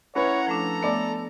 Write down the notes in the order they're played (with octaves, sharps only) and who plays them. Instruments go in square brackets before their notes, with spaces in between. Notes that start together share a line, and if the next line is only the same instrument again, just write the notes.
[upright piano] C#4 E4 B4 [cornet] C#5 [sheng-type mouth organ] F#5 A#5
[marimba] F3 A3 D4 [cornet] A4 [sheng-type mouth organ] A#5
[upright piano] A3 D5 [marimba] B3 G#5